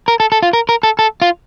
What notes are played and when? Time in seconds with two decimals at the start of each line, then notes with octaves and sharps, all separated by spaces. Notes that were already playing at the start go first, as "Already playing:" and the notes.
0.08 A#4
0.20 A4
0.32 A4
0.43 F4
0.53 A#4
0.69 A#4
0.83 A4
0.99 A4
1.22 F4